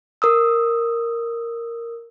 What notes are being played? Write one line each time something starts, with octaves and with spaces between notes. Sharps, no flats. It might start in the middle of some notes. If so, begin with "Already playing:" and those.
A#4 D#6 E6